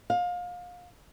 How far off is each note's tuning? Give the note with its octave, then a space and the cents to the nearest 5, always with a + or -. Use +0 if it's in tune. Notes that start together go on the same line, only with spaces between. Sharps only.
F5 +30